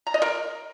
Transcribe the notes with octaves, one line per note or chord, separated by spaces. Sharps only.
A#5
D#5
A#4